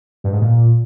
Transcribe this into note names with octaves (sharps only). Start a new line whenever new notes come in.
G2
G#2
A#2